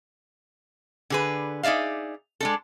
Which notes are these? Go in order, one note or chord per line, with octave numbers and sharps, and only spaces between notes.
D3 G#4 B4
D#4 G#4 D5 E5 F5
G#3 D4 A4